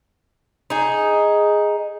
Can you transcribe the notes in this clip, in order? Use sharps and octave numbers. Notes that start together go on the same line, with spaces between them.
D#4 G#4